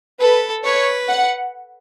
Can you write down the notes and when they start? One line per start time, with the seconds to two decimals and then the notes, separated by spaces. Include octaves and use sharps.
0.20 A4 B4
0.64 B4 C#5
1.09 F#5